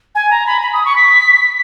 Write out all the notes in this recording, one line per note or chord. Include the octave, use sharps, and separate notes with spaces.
G#5
A#5
B5
B5
D#6
C#6
B6